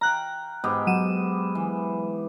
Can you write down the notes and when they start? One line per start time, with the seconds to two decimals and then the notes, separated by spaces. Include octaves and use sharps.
0.01 F5 G5 A#5 F#6
0.64 G#2 B3 G4
0.87 F#3 D#7 E7
1.55 E3